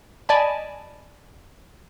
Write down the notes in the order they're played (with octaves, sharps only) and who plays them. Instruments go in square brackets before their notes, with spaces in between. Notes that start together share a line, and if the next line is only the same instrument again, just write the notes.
[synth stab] D5 D#5 G#5 A5 B5